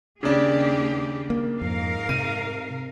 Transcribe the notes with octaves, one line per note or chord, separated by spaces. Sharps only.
D#2 C#3 D4 G4 G#4
A#3
F2 G#2 A#4 F5
C3 D#7